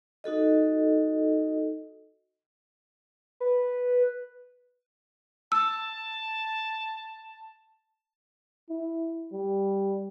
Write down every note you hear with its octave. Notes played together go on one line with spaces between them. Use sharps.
D#4 F#4 A4 D#5
B4
A5 E6
E4
G3